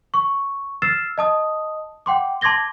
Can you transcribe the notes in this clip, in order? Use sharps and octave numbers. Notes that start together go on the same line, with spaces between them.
C#6
E6 F6 A6 C7 E7
D#5 A5 D#6
F#5 G5 C6 D6
A5 C6 D6 G#6 A#6 G7